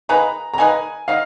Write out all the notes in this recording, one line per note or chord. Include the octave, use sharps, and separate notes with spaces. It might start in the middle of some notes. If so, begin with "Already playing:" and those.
A#3 D#4 G#4 B4 A#5
A#5
A#3 D#4 G#4 B4 G#5
A#3 D#4 F5